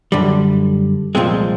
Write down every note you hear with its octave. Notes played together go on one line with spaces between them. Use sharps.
F#2 D3 G3
C2 A#2 F3 G#3 C4